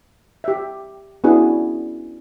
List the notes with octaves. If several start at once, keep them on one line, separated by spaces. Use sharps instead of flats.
G4 E5
B3 C#4 D4 E4 F#4 G#4